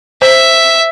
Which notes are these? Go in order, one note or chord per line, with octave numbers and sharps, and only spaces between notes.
C5 E5